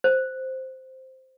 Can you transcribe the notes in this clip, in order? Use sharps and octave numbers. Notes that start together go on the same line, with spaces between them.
C5